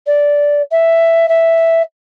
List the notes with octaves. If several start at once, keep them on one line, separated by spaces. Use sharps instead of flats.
D5
E5
E5